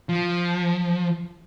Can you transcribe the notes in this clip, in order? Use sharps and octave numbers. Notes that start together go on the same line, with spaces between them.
F3